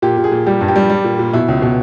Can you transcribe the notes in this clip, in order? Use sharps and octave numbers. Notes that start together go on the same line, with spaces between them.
A#2 G4
A#2
G#4
A#2
G3 G4
G2
G4
G3
G3
A#2
A#2
B2 E4
C#2
B2